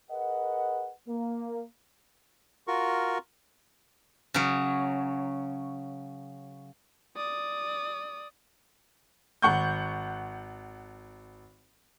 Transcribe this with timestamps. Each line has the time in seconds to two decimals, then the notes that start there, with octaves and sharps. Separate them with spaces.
0.10 G#4 A#4 B4 D#5 F#5
1.08 A#3
2.67 F4 F#4 A#4 C#6
4.34 C#3 F#3
7.17 D5 D#6
9.42 G#1 F#5 C#6 G6